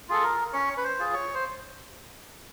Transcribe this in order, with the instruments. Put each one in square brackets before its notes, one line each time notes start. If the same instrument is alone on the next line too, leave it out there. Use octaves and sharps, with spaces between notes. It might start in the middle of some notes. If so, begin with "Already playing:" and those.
[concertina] F4 G#4 A4
A#4
C#4 C#5
B4
C5
F4 G#4
C#5
C5